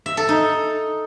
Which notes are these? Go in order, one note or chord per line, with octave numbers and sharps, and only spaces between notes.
E5
A4
D#4